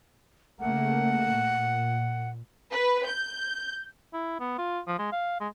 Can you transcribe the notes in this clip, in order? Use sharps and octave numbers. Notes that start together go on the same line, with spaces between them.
C#3 A3 A#3 F#5
A#2
B4
G6
E4
B3
F4
F3
G#3
F5
G#3